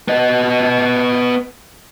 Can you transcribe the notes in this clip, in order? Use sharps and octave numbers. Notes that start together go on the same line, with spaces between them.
B3 D#5